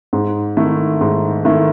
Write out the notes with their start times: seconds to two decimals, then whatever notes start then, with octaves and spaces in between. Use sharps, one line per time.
0.13 G#2
0.57 D#3 A3 E4 A4
1.01 G#2
1.45 D#3 A3 E4 A4